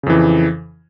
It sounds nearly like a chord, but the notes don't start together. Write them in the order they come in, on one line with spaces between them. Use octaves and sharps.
C#3 F2 E3